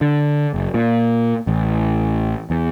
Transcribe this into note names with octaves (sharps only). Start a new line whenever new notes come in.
D3
F#1
A#2
A1
E2